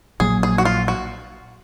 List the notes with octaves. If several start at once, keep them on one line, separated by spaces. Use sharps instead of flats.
A#1 A#2 F#3 A#3 G#4
G#4
F#4
F4
F#4